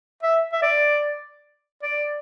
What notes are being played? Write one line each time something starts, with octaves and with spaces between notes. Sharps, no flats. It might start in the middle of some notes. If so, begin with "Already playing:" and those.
E5
E5
D5
D5